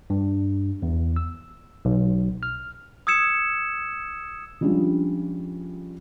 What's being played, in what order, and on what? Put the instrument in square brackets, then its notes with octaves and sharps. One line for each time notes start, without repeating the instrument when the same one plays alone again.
[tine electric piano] G2
E2
E6
B1
F6
[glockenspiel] D#6 E6 G#6 C#7 E7
[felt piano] F3 G3 G#3 C#4 D4 F4